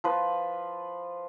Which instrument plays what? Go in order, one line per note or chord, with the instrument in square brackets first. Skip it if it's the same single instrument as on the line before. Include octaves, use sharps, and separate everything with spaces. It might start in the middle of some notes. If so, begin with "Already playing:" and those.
[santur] F3 B4